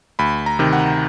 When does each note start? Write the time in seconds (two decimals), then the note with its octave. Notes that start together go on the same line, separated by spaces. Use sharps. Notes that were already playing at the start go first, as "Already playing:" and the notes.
0.19 D2 B5
0.46 A#5
0.59 C3 D#3
0.73 F#5